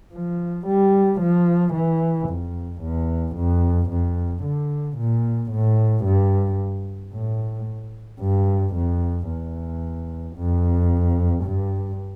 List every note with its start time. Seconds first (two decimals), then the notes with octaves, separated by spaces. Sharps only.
0.12 F3
0.66 G3
1.21 F3
1.73 E3
2.28 F2
2.82 E2
3.36 F2
3.89 F2
4.43 D3
4.97 A#2
5.51 A2
6.04 G2
7.13 A2
8.20 G2
8.75 F2
9.27 E2
10.36 F2
11.44 G2